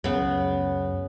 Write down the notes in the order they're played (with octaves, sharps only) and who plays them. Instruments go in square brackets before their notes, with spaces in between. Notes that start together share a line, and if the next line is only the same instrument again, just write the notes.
[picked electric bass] C#2 F#2 [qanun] C#3 B3